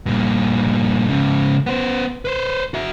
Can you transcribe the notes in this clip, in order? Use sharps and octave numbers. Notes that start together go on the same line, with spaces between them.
G2 A#2
G#2 C#3
B3 C5
B4 C5
F#4 E5